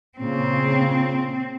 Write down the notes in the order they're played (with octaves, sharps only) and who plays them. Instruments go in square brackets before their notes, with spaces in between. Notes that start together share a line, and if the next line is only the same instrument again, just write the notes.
[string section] A#2 C#3 [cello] C4